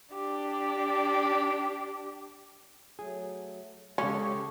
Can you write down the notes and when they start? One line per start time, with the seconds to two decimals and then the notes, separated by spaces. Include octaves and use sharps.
0.14 D4 G4
2.99 F#3 A3 G#4
3.98 C#3 G#3 C#4 G4 A4 C#6